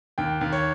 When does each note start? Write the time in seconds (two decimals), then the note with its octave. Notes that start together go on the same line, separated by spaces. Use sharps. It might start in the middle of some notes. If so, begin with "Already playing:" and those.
0.18 D#2 G5
0.41 D#2
0.52 C#5